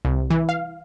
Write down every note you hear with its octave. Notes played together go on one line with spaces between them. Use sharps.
C2
E3
F5